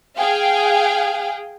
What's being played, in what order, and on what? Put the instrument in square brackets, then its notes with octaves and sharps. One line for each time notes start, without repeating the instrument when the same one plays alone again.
[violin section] G#4 F5 G5